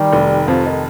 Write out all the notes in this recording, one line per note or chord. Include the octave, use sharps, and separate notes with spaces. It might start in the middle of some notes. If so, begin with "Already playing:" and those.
Already playing: D#3 G3
F1
F2 F3
D#3